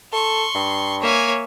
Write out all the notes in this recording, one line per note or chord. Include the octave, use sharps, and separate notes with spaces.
A4 C6 C#6
G2
A#3 C#5 E5 G#5